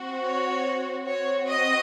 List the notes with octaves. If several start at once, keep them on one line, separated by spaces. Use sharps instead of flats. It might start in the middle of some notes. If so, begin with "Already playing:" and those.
Already playing: C4 F#4
C#5
C4 F#4 C#5
D#5